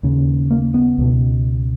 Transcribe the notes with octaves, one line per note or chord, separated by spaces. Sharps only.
D#2 C#3
A#3
B3
C#2 B2